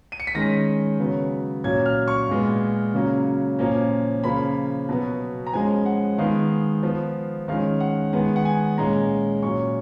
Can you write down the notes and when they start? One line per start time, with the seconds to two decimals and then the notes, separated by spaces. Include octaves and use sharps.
0.12 D#7
0.20 C#7
0.27 B6
0.35 D#3 G#3 C#4 A#6
0.99 C#3 F#3 B3
1.64 A#2 F#3 C#4 G#6
1.86 F6
2.08 C#6
2.29 A#2 G#3 B3
2.94 C#3 F#3 A#3 C#4
3.59 A#2 F3 A#3 C#4
4.24 C#3 F3 A#3 C#4 B5
4.89 B2 F#3 B3
5.47 A#5
5.53 F3 G#3 C#4 G#5
5.86 F#5
6.18 D#3 G#3 B3 F5
6.83 F3 B3
7.48 D#3 G#3 C#4 F5
7.80 F#5
8.13 D#3 G#3 B3 F#5
8.36 F#5
8.45 G#5
8.77 A#2 G#3 C#4 A#5
9.42 A#2 F#3 C#4 C#6